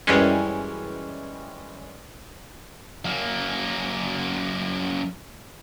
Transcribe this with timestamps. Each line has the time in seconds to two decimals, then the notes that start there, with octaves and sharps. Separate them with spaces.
0.07 F#2 E3 G3 G#3 C#4
3.05 F#2 A#3